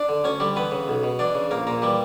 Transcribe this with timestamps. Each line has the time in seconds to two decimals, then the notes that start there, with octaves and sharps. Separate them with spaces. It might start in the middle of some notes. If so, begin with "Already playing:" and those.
Already playing: D4 D5
0.09 D3
0.24 D2 C#4 C#5
0.40 D3 G3 G4
0.56 E3 B3 B4
0.71 C#3
0.88 B1
1.04 B2
1.19 E3 D4 D5
1.35 C#3
1.51 A#1 A#3 A#4
1.67 A#2 A#3 A#4
1.82 E3 G3 G4